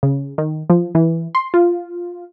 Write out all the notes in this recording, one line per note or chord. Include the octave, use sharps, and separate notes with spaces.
C#3
D#3
F3
E3
C6
F4